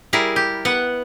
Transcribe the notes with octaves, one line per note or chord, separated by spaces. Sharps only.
G3 E4 G#4 A#4
G4
B3 F#5